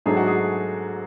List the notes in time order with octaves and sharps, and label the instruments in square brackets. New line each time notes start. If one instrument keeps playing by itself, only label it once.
[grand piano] G#2 F#3 A3 D4 G#4
F#4
G#4